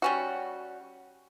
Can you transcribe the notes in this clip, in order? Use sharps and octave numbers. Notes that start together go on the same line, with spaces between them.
G3 C#4 F#4